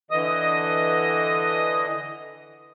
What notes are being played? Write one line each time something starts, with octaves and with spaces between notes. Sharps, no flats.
D3 E3 D#5 D#6